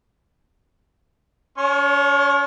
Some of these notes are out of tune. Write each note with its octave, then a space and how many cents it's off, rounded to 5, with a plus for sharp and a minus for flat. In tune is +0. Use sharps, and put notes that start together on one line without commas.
C#4 +45 C#5 +0 C#6 -30